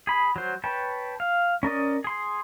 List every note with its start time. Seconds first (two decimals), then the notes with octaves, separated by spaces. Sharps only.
0.07 G#4 B5
0.36 F#3 C5
0.64 B4 C#5 G5 A5
1.20 F5
1.63 C#4 A#4 D5 D#5
2.04 G#4 C6